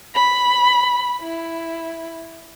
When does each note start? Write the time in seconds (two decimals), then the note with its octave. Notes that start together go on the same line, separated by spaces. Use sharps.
0.15 B5
1.21 E4